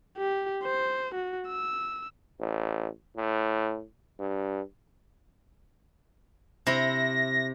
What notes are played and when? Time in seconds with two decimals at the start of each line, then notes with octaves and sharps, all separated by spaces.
0.18 G4
0.63 C5
1.15 F#4
1.48 E6
2.39 A1
3.16 A2
4.19 G2
6.67 C3 E4 A#6